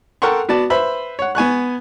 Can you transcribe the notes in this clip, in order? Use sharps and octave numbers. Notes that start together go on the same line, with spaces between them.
A4 A#4 F#5 G5 C6 C#6
B3 F#4 D5 A5
B4 C5 E5 B5
C#5 F#5
B3 G#5 C#6 F#6